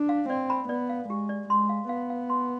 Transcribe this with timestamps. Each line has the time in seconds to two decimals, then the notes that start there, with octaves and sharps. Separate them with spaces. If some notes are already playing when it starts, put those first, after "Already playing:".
Already playing: D4
0.09 F5
0.29 C4 D5
0.50 B5
0.69 B3 D5
0.89 F5
1.09 G#3 G4
1.29 D5
1.49 G#3 C6
1.69 F5
1.89 B3 F5
2.10 F5
2.30 C6